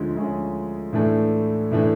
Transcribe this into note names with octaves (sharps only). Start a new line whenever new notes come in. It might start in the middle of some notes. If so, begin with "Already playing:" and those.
Already playing: D2 D3 F3 G#3 C#4
D2 D3 F3 G#3 C#4
A2 E3 A3 D4
A2 E3 A3 D4